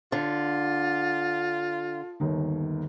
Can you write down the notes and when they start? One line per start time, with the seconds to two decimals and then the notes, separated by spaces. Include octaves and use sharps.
0.12 D3 F4
2.20 G1 D#2 D#3